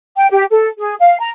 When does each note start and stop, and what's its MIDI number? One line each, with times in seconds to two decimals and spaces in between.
0.17 0.27 79
0.31 0.45 67
0.51 0.68 69
0.78 0.95 68
1.00 1.19 77
1.19 1.30 82